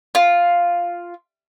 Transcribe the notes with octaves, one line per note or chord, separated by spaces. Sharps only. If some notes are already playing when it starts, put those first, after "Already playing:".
F4